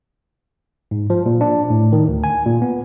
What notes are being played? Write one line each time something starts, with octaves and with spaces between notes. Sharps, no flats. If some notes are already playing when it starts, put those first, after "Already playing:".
G#2
F3
A#2
D4
A2
D#3
D2
G#5
A#2
B3